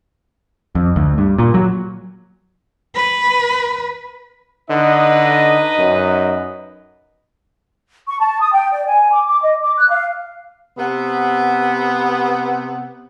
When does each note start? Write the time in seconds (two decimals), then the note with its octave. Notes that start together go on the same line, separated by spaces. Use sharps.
0.75 F2
0.96 D2
1.18 G2
1.38 A#2
1.54 F#3
2.95 B4
4.70 D3 D#4 B4 D#5
5.79 F#2
8.07 C#6
8.20 A5
8.41 D#6
8.52 G5
8.72 D5
8.87 G#5
9.12 D6
9.27 D6
9.43 D#5
9.62 D6
9.77 F#6
9.91 F5
10.78 C3 B3